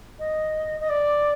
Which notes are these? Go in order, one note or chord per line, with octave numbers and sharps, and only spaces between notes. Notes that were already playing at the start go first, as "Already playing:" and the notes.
D#5
D#5
D5